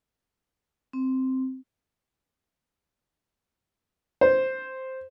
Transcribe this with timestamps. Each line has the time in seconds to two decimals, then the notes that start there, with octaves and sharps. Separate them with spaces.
0.93 C4
4.21 C5